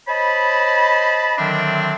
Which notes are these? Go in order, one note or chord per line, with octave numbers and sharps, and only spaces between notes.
C5 C#5 D#5 A5 B5
D3 D#3 F#3 C4 D4 E5